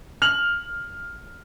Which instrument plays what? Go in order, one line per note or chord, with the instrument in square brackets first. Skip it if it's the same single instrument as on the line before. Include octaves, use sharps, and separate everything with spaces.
[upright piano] F6 F7 F#7